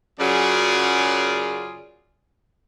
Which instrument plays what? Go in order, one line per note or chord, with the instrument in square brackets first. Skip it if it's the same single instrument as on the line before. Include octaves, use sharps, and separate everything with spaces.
[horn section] F#2 C#3 F#3 F4 G#4 D5